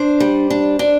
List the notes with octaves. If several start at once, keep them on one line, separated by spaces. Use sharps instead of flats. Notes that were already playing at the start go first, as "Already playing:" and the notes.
Already playing: D4 C5
G3
D4
D4